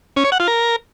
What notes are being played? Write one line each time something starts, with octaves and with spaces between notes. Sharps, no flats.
C#4
C#5
F#5
F4
A#4